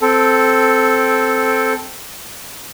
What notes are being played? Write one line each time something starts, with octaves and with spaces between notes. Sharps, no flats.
C4 A4